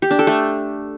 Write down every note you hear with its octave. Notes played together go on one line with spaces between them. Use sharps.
G4
D4
A4
A3